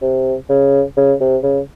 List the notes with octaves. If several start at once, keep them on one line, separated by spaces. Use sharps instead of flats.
C3
C#3
C#3
C3
C#3